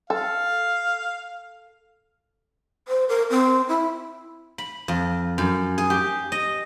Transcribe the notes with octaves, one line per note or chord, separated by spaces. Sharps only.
A4 F5
C5
A#4
C4
E4
B5
F2
F#2
G#4
G4
D#5